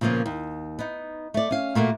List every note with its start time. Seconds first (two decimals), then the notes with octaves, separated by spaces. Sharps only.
0.01 A#2 C#3 F3 G3 A#3 B3
0.26 D#2
0.79 B3 D#4
1.34 A3 D5
1.51 C#4 F5
1.75 A#2 A3 A#3 F#4